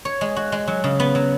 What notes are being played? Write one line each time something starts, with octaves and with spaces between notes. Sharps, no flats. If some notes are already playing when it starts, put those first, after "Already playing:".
C#5
G#3
F#4
G#3
F#3
C#3
B3
F#3